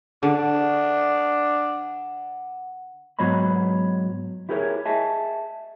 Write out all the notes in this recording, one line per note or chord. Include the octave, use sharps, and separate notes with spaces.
D3 D4 F#5
G#2 F#3 B3 C#5 D#5 B5
E4 G4 G#4 A#4 B4 C#5
G#4 D#5 E5 G#5 A5